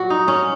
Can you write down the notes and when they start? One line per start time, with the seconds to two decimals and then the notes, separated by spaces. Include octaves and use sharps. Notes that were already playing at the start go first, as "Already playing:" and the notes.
Already playing: A#2 F#3 F#4
0.10 D#4
0.28 C#4